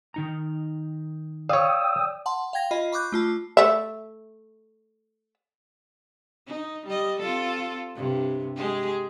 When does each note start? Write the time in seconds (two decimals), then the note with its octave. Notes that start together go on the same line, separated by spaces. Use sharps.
0.14 D#3 D#4 A#5
1.49 C#5 D5 F5 G5 D#6 E6
2.26 F#5 A5 C6
2.53 F5 G5 G#6 A#6
2.71 F4 D#5 B5
2.92 B5 C#6 D6 F#6 G6
3.12 A3 F4 A5
3.57 A3 E5
6.47 D#4
6.87 G3 D#5
7.20 C4 F4 A4
7.95 G2 C3
8.55 G#3 G4 G#4